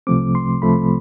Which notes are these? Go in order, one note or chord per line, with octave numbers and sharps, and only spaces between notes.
C2 C3 F3 A3 C4 D6
C6
C2 C3 F3 A3 C4 B5